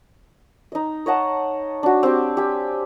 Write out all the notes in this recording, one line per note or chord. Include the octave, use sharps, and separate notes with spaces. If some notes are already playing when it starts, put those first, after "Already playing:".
D#4 D#5
C#5 D#5 F#5 A5
D4 F#4
C4 G4
G4 G#5